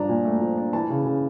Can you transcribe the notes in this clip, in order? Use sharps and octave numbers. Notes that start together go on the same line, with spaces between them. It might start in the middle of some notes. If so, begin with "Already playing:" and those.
Already playing: G2 F3 D4 A#5
A#2
A3
F3
D4
E3 A5
C#3
C#3